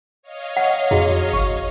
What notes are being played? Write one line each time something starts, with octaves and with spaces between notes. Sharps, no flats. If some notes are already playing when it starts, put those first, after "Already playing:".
C#5 D#5 F5
F#5
F2 E4 F#4 G#4
G1 C#6